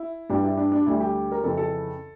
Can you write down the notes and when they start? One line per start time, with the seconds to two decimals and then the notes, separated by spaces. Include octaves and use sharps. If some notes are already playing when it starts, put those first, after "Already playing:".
Already playing: E4
0.30 G2 E3 G3 D4
0.43 E4
0.57 D4
0.72 D4
0.86 D2 D3 G3 E4
1.00 G4
1.32 A#4
1.44 F2 C#3 E3 A4
1.57 A4